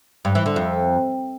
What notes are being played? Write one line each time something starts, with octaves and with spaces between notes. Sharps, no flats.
G2
E3
D3
F2